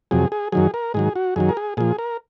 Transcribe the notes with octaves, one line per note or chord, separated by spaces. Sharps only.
F2 C3 F#3 G#4
G#4
F#2 D#3 F#3 G#4
A#4
G#2 D#3 F#3 G#4
F#4
F#2 D#3 F#3 G#4
A#4
G#4
A#2 F3 G#4
A#4